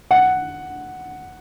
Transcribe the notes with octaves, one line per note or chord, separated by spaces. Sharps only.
F#5